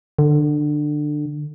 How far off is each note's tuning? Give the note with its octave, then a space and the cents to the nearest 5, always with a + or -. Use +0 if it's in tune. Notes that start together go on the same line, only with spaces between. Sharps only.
D3 +20